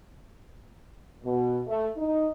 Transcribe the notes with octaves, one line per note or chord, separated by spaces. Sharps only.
B2
A3
D#4